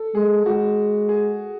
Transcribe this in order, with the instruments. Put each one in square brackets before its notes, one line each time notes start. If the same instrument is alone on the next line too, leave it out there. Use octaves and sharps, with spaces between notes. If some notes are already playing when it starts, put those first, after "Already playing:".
Already playing: [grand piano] A4
[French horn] G#3 [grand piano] G#4
[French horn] G#3 [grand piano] F#4
[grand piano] G#4